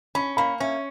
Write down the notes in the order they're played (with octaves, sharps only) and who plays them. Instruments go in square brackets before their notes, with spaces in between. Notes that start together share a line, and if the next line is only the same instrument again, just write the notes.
[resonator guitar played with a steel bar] C#4 [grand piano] B5
[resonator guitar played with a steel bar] A#3 [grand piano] B5
[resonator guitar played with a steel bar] C#4 [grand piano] E5